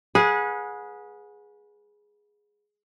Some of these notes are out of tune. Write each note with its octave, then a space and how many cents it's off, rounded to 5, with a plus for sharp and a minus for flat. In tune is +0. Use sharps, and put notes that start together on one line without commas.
G#4 +0 B4 -25 F#5 -35